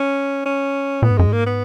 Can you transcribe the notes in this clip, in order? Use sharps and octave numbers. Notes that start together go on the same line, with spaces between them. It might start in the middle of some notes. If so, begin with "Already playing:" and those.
Already playing: C#4
C#4
A#2 B3
G#2
F#2 G#3
G#2
A#3
B3